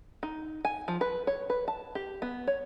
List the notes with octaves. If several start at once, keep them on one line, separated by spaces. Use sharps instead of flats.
D#4
G#5
F3
B4
C#5
B4
A5
G4
B3
C#5